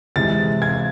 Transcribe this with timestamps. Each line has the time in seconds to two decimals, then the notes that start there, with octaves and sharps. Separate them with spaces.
0.16 C3 E3 G#3 A6
0.62 G#6